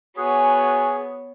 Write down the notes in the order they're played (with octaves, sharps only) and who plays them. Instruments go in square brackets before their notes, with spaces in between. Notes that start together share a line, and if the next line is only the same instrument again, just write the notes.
[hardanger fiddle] B3 C#5 [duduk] F#4 [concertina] G#4 [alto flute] G#5